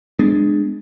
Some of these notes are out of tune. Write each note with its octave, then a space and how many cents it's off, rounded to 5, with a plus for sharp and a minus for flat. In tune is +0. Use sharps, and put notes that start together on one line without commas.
G#3 +0 B3 +30 D4 +25